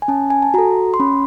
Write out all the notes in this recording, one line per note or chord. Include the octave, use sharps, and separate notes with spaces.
G#5
C#4 A5
G#5
A5
F#4 A4 A#5
C6
C#4 B5